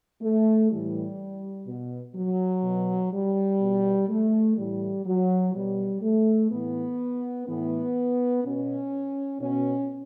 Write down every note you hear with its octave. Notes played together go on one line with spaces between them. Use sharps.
A3
A2 E3 G3
B2
F#3
B2
G3
B2
A3
A2 E3 G3
F#3
B2 G3
A3
A2 E3 B3
A2 E3 B3
B2 C#4
B2 C#4